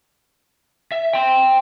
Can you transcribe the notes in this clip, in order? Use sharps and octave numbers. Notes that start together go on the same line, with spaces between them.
E5
G5 C6